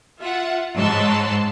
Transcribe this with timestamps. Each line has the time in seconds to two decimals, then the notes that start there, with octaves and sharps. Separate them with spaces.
0.19 F4 E5 F#5
0.76 G#2 C#5 A5 C6 E6 F#6